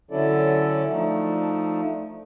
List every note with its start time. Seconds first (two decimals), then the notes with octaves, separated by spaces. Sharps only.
0.11 D3 F#3 C#4 E4 A4 D5
0.92 F3 A3 D4 D#4